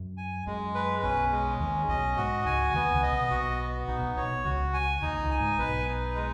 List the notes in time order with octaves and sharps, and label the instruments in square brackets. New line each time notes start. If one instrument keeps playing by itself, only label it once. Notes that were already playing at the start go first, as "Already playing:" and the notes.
Already playing: [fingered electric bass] F#2
[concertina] G#5
[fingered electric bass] F#2 [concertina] G#3
[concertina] B4
[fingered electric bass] B1 B2 [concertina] C#4
[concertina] G#3
[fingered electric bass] D#2 D#3 [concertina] C#4
[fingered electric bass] B1 B2 [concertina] D#5
[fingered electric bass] G#2 [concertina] F#4
[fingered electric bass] C#2 C#3 [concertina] G#5
[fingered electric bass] D#2 D#3 [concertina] B3
[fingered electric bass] C#2 C#3
[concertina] D#5
[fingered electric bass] B1 B2
[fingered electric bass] B1 B2 [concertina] F#4
[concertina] B3
[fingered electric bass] B1 B2 [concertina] D#4
[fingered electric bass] B1 B2
[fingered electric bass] B1 B2 [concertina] C#5
[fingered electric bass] C#2 C#3 [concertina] F#4
[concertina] G#5
[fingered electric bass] D#2 D#3 [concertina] D#4
[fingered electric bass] C#2 C#3
[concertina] G#5
[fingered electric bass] G#2
[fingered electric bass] B1 B2 [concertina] B4
[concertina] D#4
G#3